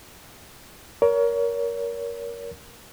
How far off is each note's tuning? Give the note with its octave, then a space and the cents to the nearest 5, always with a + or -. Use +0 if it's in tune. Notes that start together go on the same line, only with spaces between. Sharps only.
A#4 +15 C#5 +30